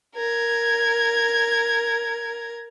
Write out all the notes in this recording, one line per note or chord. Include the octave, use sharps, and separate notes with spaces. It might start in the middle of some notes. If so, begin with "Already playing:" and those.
A#4 G#6